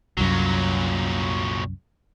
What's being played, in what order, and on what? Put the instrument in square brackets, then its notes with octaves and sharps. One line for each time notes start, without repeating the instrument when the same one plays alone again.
[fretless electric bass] C2 F#2 [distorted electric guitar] A#2 F#3